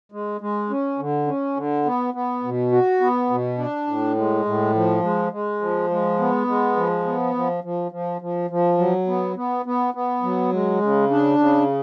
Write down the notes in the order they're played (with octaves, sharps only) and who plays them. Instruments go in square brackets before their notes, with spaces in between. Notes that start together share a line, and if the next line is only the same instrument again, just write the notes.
[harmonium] G#3
G#3
C#4
D3
C#4
D3
B3
B3
B2
F#4
B3
B2
D4
A2
G#3
A2
F3
G#3
G#3
F3
G#3
B3
G#3
F3
B3
F3
F3
F3
F3
F3
F#3
B3
B3
B3
B3
F#3
G#3
C#3
D4
C#3